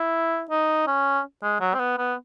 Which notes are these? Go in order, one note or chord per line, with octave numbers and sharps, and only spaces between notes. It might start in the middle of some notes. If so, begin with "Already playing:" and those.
Already playing: E4
D#4
C#4
G#3
F#3
C4
B3
B3